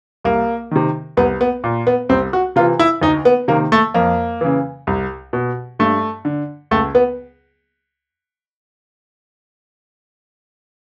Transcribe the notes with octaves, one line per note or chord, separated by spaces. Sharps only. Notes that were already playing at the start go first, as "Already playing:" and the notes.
C2 A#3
C3 D#3
C2 B3
B3
A#2
B3
C2 C4
F#4
C3 E3 F4
E4
D2 D#4
B3
C3 D#3 A#3
A3
F2 A#3
C#3 E3
C2
B2
G2 A3
D3
C#2 A3
B3